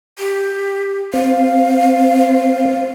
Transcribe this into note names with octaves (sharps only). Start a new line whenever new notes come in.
G4
C4 F5